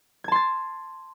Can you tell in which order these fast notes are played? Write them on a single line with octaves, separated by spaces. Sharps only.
G#6 A5 C6 A6